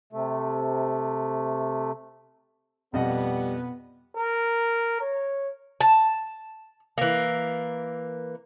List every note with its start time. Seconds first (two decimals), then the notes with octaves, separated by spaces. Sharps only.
0.13 C3 A3
2.94 F2 B2 G3 B3 C4 D#5 F#5
4.17 A#4
5.01 C#5
5.81 A5
6.98 E3 A#3